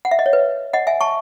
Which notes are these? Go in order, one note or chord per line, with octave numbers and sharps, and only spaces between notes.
F#5
E5
D#5
C#5
B4
D#5 F#5
E5 G#5
A5 C#6